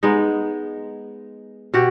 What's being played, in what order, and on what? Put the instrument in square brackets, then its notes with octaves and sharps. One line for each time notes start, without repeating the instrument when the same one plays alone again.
[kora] G#3 B3 D#4
B2 F#4 G4